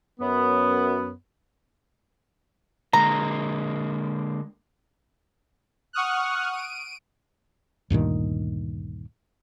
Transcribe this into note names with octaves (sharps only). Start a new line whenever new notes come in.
F#2 B3
D3 G#3 A#3 A#5
F#5 C#6 D#6 F6 F#6
D7 D#7
D2 G2 A#2 D#3